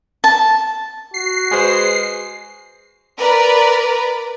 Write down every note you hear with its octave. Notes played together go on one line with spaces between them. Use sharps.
A5
F#4 C7
G#3 B4 C5 G#5
A#4 B4 D5